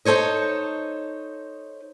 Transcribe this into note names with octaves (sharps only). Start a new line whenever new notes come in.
D#4 A4 C5 C#5 D#5